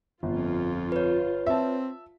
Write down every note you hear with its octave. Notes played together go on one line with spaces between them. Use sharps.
G1 F2 F4
B4 C#5
C4 E5 A5